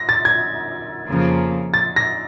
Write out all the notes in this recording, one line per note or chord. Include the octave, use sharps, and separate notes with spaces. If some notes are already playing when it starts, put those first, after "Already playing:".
Already playing: A#6
A6
G#6
F2 C#3 F3 A#3
A6
A#6